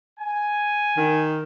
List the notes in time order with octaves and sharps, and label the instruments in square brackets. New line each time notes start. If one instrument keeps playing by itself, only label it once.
[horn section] G#5
[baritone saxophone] D#3